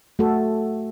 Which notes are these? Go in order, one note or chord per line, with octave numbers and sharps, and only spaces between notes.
A3 F#4 A4